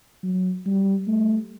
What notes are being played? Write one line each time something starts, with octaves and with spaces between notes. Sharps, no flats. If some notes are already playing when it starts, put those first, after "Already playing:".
F#3
G3
A3